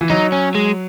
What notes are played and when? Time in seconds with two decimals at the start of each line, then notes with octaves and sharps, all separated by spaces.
0.01 E3
0.10 F#3 D#4
0.32 C#4
0.55 G#3